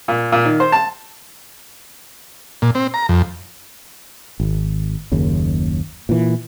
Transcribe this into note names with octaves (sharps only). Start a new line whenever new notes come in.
A#2
A#2
D#3
C5
A5
A#2
C4
A#5
F2
G#1
F#1 D#2 C#3
A#2 E3